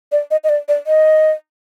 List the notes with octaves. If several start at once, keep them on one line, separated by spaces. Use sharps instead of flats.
D5
D#5
D#5
D5
D5
D#5